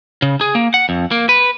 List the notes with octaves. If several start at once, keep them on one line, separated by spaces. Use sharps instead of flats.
C#3
G#4
A#3
F#5
F2
A#3
B4